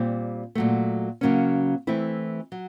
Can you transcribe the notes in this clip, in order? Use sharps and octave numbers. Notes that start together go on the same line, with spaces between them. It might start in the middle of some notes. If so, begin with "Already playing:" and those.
Already playing: A#2 G3 C4
A#2 F#3 A3
C#3 F#3 A#3 C#4
E3 A3 C4 E4
F#3